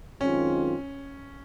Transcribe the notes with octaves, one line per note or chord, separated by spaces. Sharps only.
F#2 D#3 G#3 C4 C#4 F4